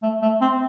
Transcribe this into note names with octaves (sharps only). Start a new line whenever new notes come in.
A3
A3
C4